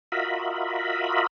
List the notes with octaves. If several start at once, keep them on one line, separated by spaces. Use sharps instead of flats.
F4 F#4 A#4 D#5 E5 B5